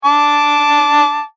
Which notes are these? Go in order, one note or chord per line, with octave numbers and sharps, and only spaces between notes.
A5 D6